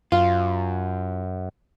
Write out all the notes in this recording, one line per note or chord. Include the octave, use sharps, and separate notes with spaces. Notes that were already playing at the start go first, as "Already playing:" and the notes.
F#2 F4